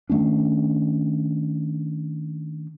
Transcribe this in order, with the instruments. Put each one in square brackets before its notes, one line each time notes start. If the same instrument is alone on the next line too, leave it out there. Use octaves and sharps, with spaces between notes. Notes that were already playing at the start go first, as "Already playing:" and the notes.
[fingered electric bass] D#3 A3 C#4 D4